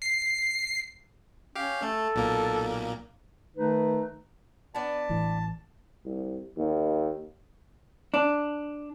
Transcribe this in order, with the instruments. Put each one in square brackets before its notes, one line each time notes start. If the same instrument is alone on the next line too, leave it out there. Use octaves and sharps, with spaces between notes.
[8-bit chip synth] C7
[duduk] C#4 [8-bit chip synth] G4 F5
[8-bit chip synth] A3 [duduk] A4
[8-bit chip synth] B1 A#2 A#3
[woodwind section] D#3 A3 D#4 B4
[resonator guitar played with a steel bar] B3 D4 [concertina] A5
[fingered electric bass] A1 E3
[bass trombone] C2
D#2
[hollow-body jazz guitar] D4